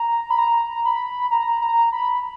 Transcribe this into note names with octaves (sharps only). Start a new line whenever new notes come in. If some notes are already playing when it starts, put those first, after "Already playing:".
Already playing: A#5
B5
A#5
B5
A#5
A#5
B5